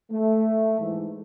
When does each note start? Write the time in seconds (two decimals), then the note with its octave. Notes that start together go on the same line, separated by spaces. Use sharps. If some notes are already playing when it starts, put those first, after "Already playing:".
0.11 A3
0.79 G#2 E3